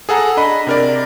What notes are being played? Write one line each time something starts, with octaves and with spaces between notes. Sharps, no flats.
G#4 A4 F#5 A#5
D4 D#5 B5
C3 A#4 D5